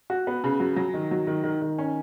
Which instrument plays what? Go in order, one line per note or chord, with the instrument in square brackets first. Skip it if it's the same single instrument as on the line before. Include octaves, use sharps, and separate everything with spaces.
[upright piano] F#4
B3
C#3
F#3
F#3
D#3
F#3
D#3
D#3
D#3
C#4